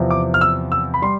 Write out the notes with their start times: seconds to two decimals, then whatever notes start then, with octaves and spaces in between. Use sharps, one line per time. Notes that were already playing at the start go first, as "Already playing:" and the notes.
Already playing: E2 C3 F3 C4
0.11 D6
0.34 F6
0.41 E6
0.72 E6
0.94 B5
1.02 G3 C6